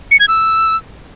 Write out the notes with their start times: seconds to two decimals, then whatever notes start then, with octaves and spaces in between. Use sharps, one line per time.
0.11 C#7
0.20 G#6
0.28 E6